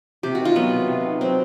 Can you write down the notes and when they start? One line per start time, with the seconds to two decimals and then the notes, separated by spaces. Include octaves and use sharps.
0.23 C3 G4
0.35 F#4
0.40 D#3
0.45 F4
0.56 F#3 B3
0.72 C3
0.88 C3
1.05 D#3
1.21 F#3 C4